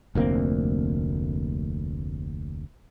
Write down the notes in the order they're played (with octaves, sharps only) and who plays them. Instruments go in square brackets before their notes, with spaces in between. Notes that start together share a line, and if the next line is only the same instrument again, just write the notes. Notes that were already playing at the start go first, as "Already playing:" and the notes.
[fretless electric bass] F1 D2 A#3 C4